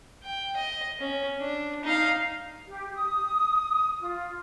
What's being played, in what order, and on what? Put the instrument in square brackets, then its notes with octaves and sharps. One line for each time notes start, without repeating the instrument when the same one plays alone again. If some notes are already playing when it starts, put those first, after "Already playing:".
[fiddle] G5
D#5
C#4
D4
D#4 F5
[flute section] G4
D#6
F4